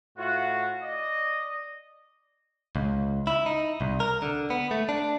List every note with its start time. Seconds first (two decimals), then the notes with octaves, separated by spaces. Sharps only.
0.17 A2 F4 F#4
0.81 D5 D#5
2.76 C#2
3.27 E4
3.46 D#4
3.81 C2
4.00 A#4
4.22 D3
4.50 B3
4.71 A3
4.89 D4